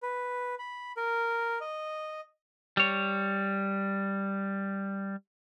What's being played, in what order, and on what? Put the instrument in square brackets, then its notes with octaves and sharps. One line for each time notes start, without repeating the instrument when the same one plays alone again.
[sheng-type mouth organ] B4
B5
A#4
D#5
[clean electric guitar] G3 C#5